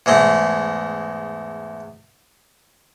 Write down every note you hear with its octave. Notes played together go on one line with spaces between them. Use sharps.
E2 G#2 G#3 A3